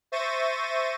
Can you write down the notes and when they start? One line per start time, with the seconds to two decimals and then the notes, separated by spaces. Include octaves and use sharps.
0.12 C5 E5 C#6 A6 A#6 D#7